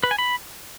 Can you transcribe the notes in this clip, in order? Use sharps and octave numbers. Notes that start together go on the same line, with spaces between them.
B4
G#5
B5